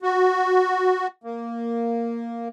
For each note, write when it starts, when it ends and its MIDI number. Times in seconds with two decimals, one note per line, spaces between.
0.02 1.07 66
1.24 2.48 58